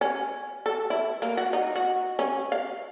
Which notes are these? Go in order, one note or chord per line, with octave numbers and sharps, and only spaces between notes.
C#4
A4
E4
A#3
F#4
D#4
F#4
C#4
F5